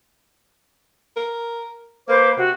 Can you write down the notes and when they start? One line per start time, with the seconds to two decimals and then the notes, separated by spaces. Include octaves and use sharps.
1.16 A#4
2.08 A#3 B4 C5 D6
2.37 C3 F#4